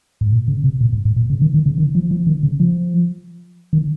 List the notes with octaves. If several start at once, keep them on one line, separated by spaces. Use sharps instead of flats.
G#2
A#2
C#3
C3
A#2
G#2
G#2
A#2
C#3
D#3
D#3
C#3
D#3
F3
F3
D#3
C#3
F3
D#3